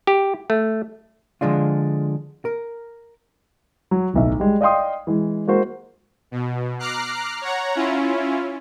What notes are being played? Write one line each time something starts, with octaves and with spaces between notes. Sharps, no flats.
G4
A3
D3 F3 G#3 D4 F4
A#4
F#3
D1 B1 E5
G3 G#3
D5 D#5 F5 G5 C6 D#6
E3 G#3
G#3 A#3 F#4 C5
B2
A#5 D6 F6 F#6 C7
C#5 F#5 A#5
C#4 E4 F4